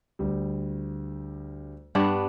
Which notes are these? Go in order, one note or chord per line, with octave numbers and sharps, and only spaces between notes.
D2 G3
G2 B3 D4